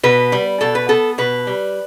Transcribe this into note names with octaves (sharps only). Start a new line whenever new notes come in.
B2 B4
G3
B2 A4
B4
B3 A4
B2 B4
G3